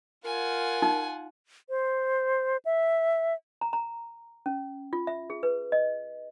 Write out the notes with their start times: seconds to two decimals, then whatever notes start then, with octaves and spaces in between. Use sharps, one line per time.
0.25 F4 A#4 F#5 G#5
0.82 D#4
1.69 C5
2.65 E5
3.61 A#5
3.73 A#5
4.46 C#4
4.93 F4
5.07 E5
5.30 G#4
5.43 B4
5.72 D#5